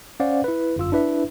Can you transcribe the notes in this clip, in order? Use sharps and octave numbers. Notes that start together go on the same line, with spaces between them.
C#4 C5 D5 F5 F#5
E4 B4
G1 F#2 F4 E6
D4 E4 B4 E5